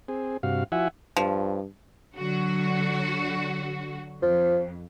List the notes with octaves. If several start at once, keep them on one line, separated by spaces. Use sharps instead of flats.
C4 G#4
G2 C3 F#4 F5
F3 E4 F#4 E5 F#5 G#5
G2 F3
D3 F#3 F#4
F2 F3